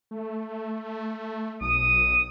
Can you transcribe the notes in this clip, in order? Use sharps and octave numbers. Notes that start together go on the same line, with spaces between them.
A3
B1 D#6